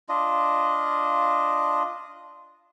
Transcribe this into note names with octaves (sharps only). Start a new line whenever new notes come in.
D4 F4 D#5